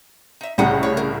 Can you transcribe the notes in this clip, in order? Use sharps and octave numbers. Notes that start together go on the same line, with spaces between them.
D#4 E5
C2 A2 C#3 D#4 F#5 G5
C#5
A#4